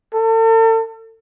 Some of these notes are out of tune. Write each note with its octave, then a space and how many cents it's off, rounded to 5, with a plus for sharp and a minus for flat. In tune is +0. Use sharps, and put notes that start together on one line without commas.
A4 +40